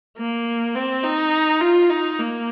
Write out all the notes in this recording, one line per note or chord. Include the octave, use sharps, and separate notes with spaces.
A#3
C4
D#4
F4
D#4
A#3